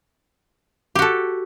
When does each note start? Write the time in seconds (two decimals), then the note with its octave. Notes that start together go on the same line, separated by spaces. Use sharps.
0.95 G4
0.99 F#4
1.02 A4